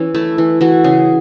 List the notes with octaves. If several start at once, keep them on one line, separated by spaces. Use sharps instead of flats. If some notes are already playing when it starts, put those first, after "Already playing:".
Already playing: E3 C#4
A3 E4
E3
E3 F#4
C#3 G#4